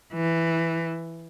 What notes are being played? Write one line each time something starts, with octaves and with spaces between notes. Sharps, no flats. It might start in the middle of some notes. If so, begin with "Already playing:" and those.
E3